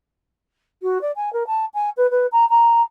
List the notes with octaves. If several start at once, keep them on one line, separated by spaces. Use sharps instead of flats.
F#4
D5
G#5
A#4
A5
G#5
B4
B4
A#5
A#5